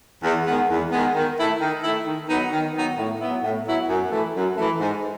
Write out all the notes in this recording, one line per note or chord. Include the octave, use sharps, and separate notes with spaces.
E2
D#3 G#3 B3
E2
D#3 G#3 B3
D#3
A3 E4
D#3
A3 E4
D#3
F#3 B3 D#4
D#3
F#3 B3 D#4
A2
F#3 B3 E4
A2
F#3 B3 E4
F#2
E3 A3
F#2
E3 A3
G#2